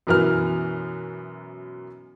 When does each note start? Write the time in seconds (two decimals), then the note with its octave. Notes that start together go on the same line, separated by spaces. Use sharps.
0.07 F#2 B2 E3 A#4 B4 F6